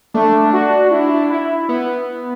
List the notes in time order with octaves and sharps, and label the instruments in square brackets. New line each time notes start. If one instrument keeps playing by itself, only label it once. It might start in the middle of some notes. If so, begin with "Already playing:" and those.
[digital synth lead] A3 [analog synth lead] D4
[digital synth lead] F#4
E4
E4
[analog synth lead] B3